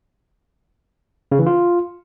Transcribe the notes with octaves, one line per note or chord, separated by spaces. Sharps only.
C#3
E3
F4